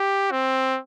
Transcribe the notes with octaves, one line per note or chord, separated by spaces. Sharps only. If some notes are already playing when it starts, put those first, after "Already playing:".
Already playing: G4
C4